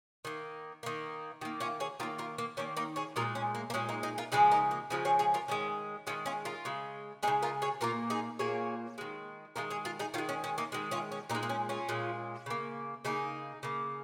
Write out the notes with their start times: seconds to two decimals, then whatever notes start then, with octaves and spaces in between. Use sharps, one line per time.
0.25 D#3 A#3
0.83 D#3 A#3
1.41 D#3 A#3
1.60 C#4 F4
1.80 G#4 C#5
2.00 D#3 F4 A#4
2.03 A#3
2.18 F4 A#4
2.38 A#3
2.57 D#3 A#3 C#4
2.77 A#3 D#4
2.96 G#4 C#5
3.16 A#2 G#3 F4 A#4
3.35 C#4
3.55 A#3
3.70 A#3
3.74 A#2 G#3 C#4
3.89 A#3 D#4
4.03 D#4 G#4
4.18 F4 A#4
4.32 C#3 F3 G#3 D#4 G#4
4.52 A#3 D#4
4.71 A#3
4.90 C#3 F3 G#3 C#4
5.05 G#4 C#5
5.19 G#4 C#5
5.34 F4 A#4
5.48 D#3 G#3 C#4
6.07 D#3 G#3 C#4 F4
6.26 C#4 F4
6.45 F4 A#4
6.65 C#3 G#3
7.23 G#3 D#4 G#4
7.27 C#3
7.42 F4 A#4
7.62 G#4 C#5
7.81 A#2 A#3 F4 A#4
8.10 D#4 G#4
8.39 A#2 A#3 G#4 C#5
8.98 D#3 G#3
9.56 D#3 G#3 F4 A#4
9.70 G#4 C#5
9.85 F4 A#4
9.99 D#4 G#4
10.14 D#3 C#4 F4
10.18 G#3
10.29 C#4
10.44 C#4
10.58 A#3 D#4
10.72 D#3 G#3
10.91 C#4 F4
11.12 C#4
11.30 A#2 A#3 D#4
11.35 G#3
11.43 A#3
11.49 C#4
11.69 C#4 F4
11.89 A#2 G#3
12.46 C#3 A#3
13.05 C#3 A#3 D#4 G#4
13.63 C#3 A#3